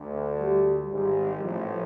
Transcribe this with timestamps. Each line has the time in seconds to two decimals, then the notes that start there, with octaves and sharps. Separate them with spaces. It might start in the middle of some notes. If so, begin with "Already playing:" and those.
Already playing: D2 D3
0.40 G3
0.92 G#1 G#2 G3
1.43 A1 A2 F3